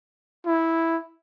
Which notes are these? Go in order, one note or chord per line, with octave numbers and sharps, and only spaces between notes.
E4